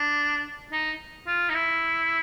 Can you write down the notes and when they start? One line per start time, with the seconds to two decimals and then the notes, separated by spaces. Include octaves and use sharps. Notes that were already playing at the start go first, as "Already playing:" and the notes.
Already playing: D4
0.72 D#4
1.27 F4
1.49 D#4
1.54 E4